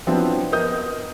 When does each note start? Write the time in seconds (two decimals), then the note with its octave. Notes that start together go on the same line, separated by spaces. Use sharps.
0.07 F3 F#3 B3 C4 D4 E4
0.52 B3 A#4 D#5 D#6 G6